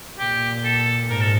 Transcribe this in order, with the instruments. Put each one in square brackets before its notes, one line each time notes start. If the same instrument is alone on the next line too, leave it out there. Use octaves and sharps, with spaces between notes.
[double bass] A#2 [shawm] G4
[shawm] A4
[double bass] G#2 [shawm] A#4
[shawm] A4